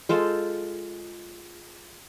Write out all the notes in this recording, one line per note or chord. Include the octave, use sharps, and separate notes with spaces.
G#3 F4 A4 C5